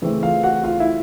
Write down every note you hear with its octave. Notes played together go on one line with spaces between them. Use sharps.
C#3 E3 A3 C4
F4 F5
F#4 F#5
F4 F5
E4 E5